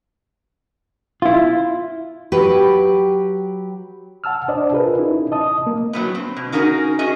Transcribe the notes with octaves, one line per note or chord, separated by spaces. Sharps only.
E4 F4
F#3 G4 B4
F#5 A5 E6 F6
D4 C5 D5 D#5 A5
F4 G#4 A#4 B4
C#4 D#4 E4
D#5 A5 D#6
A#3
A2 F#3 G3 B3
C4
B2
C#4 D#4 F#4 G#4 A#4
C#4 F#4 G#4 D#5 G#5